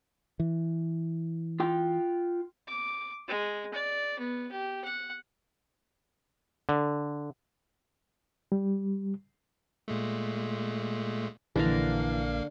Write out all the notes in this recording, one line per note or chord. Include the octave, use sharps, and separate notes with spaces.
E3
F4 G5
D6
G#3
D5
B3
G4
F#5
D3
G3
A#2 G#3 A3
A#1 D3 E3 A#3 D4 A#4 F5